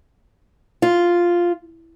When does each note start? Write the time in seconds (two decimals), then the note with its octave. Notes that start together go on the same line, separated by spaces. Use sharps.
0.82 F4